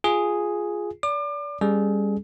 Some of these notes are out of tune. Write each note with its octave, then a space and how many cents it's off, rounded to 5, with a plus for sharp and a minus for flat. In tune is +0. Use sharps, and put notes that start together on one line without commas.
F4 +0 G#4 +0
D5 -30 D6 +35
G3 +35 C#4 +0 G#4 +30